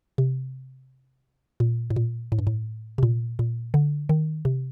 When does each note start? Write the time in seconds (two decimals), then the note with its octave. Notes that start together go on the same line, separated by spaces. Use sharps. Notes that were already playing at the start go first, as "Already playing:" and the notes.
0.18 C3
1.60 A#2
1.90 A2
1.96 A#2
2.32 A2
2.39 G2
2.47 A2
2.98 C3
3.03 A#2
3.39 A#2
3.74 D3
4.09 D#3
4.45 C3